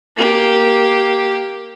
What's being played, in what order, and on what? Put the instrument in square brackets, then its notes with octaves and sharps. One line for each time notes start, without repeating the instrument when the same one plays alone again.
[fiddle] A#3 G4